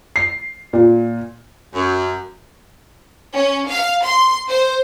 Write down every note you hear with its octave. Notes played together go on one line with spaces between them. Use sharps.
C7
A#2
F#2
C#4
F5
C6
C5